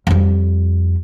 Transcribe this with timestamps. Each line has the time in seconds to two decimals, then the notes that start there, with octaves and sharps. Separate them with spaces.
0.07 F2 G3